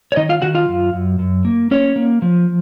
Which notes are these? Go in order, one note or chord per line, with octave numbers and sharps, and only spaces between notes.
C#5
D#3 D#4 D#5
F4 F5
D#3 F#4 F#5
F4 F5
F#2
F#2
F#2
A#3
A#3 C#4 C#5
A#3
F3